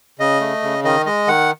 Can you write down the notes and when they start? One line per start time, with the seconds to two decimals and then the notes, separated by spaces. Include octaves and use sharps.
0.19 C#3 D#5
0.40 A3
0.62 C#3
0.84 D#3 D#5
1.06 G#3 D#5
1.28 D#3 F#5